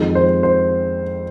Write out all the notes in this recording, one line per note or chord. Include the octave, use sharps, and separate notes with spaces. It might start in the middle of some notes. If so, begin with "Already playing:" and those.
Already playing: F2 D#3 G#3
C5
C5